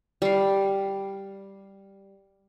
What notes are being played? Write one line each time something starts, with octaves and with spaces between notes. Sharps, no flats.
G3 F5